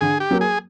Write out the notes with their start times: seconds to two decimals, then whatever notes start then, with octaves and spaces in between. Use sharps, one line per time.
0.01 D3 G#4
0.20 G4
0.31 F#3 A#3
0.41 G#4